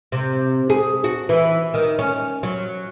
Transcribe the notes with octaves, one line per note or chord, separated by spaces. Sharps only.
C3
G#4
F#4
E3
D#3
C#4
F#3